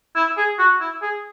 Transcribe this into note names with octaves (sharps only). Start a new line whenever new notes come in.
E4
G#4
F#4
E4
G#4